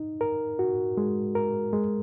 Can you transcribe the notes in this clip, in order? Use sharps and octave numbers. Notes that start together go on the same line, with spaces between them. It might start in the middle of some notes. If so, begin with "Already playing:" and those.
Already playing: D#4
A#4
F#4
G#3
A#4
G#3